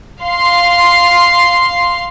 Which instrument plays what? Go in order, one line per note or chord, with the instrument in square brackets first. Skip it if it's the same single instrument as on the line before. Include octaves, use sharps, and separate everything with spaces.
[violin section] F5 C6